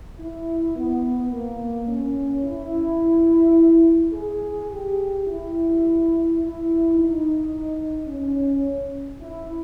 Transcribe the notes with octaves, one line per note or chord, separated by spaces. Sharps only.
E4
B3
A#3
C#4
E4
G#4
G4
E4
E4
D#4
C#4
E4